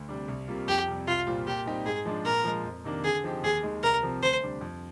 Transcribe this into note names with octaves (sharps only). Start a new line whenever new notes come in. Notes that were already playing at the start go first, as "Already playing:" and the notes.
Already playing: D2
C3 G3 D4
C2
C3 G3 A#3 F4
F2 G4
C3 G3
C2 F4
A#2 G3 C4 F4
A#2 G4
G3 C4 D#4 G4
G#2 G#4
F3 G#3 D4
A#2 A#4
F3 G#3
F2
C3 D#3 A#3 D4
D3 G#4
F3 C4 D#4 G4
D#2 G#4
D#3 G#3
C2 A#4
C3 F3 C4
D2 C5
C3 G3 D4
F2